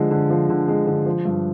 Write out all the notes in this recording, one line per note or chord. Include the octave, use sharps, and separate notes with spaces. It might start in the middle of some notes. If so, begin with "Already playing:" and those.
Already playing: D3 F3 G#3
D3
F3
D3
G#3
D3
F3
G2